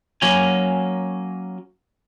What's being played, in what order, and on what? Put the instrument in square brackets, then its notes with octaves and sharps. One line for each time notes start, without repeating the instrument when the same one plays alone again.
[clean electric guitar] F#3 A#3 C#4 G#5